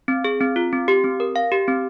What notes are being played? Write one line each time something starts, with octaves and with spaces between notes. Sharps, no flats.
C4
G#4
C4
F4
C4
G4
C4
A#4
F5
G4
C4